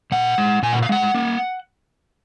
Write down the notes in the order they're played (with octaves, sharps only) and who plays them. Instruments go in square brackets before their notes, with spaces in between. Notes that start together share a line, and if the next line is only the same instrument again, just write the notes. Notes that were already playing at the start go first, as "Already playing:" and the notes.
[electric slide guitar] A#2 F#5
G#3
A#2 G#5
F#5
F5
G#3 F#5
A#3